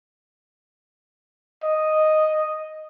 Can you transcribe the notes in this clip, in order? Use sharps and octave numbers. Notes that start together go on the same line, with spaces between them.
D#5